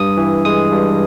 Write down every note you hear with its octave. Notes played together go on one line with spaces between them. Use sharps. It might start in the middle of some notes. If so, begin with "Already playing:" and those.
Already playing: G2 D#6
E3
G#3 D#6
G2